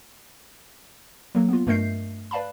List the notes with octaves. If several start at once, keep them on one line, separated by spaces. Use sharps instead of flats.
F#3 A#3 A4
B3 F4
G2 A3 A#4 D#5 G6 C7
B4 D5 F5 A5 B5